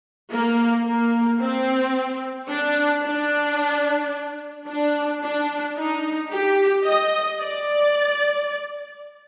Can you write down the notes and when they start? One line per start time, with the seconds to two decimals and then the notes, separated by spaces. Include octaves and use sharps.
0.32 A#3
0.86 A#3
1.40 C4
2.50 D4
3.04 D4
4.67 D4
5.22 D4
5.76 D#4
6.31 G4
6.85 D#5
7.40 D5